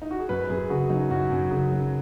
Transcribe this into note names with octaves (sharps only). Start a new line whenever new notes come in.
D#4
F#4
G#4
F#2 B4
F#2 G#4
C#3 F#4
F#3 D#4
F#2 F#4
F#2
C#3
F#3